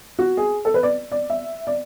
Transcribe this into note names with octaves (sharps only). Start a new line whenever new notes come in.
F#4
G#4
A4
B4
D5
D5
E5
D5